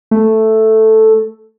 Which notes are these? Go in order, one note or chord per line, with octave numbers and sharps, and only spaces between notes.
A3